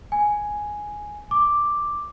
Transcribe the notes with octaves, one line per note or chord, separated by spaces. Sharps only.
G#5
D6